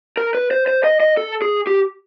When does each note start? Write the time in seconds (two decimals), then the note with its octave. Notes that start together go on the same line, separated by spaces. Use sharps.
0.17 A#4
0.35 B4
0.51 C5
0.67 C5
0.84 D#5
1.00 D#5
1.17 A4
1.42 G#4
1.67 G4